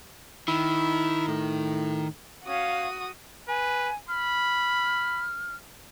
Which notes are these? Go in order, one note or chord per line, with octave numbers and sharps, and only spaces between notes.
D#3 E4
A2
C#4 F#4 F5 D#6
B4 G#5
B5 F6